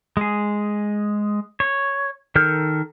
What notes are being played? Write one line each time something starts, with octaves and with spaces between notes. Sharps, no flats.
G#3 G#4
C#5
D#3 A4 A#4 F6 G6